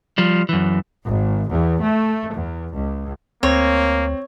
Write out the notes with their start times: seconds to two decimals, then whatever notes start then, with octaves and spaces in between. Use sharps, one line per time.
0.18 F3 G3
0.49 F#2 E3
1.05 G#1
1.51 E2
1.82 A3
2.33 E2
2.74 C#2
3.43 D2 A#3 C4 C#5